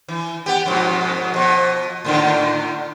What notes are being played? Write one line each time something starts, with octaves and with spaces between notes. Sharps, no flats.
E3
B3 G4
F2 G#2 B2
B2 F3
A2 D3 D#3